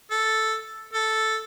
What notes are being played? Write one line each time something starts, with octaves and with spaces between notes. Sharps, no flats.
A4
A4